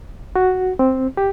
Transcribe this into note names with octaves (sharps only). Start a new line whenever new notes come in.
F#4
C4
G4